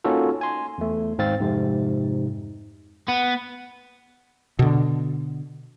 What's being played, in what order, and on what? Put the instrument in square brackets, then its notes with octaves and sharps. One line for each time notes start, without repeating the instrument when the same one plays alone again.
[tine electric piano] A#3 C#4 D#4 F4 F#4 A4
G#5 C6
E2 A3
G#1 G#2 C4 F5 A6
F2 G#2 C3
[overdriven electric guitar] B3
[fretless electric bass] B2 D3